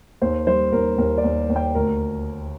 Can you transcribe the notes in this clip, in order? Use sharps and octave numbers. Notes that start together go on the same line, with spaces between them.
D#2 C5
G3 C5
D#2 A#4
D#2 A#4
D5
D#2
D#2
G5
D2 A#4